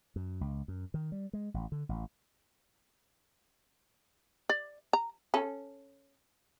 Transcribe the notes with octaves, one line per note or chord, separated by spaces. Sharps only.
F#2
C#2
F#2
D#3
G3
G#3
A1
D3
A1
D5
A#5
C#4 A4